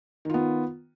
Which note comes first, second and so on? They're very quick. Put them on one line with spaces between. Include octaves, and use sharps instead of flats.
D#3 F4 B3